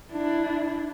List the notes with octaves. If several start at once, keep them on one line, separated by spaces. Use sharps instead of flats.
D4 E4